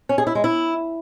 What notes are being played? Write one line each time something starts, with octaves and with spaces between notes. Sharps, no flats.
C#4
G#4
E4
G#3
E4